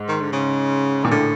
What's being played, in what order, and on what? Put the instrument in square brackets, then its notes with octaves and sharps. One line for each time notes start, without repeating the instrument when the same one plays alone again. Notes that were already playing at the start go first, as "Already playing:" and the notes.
Already playing: [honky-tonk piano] G#2
[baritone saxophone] D#3
D3
C#3
[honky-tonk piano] A#2 [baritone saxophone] D#3
[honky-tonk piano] A2 [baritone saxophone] D3